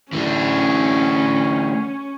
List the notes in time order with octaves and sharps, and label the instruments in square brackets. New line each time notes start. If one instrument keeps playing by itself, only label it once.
[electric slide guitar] E3 A3 D4 [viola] C#4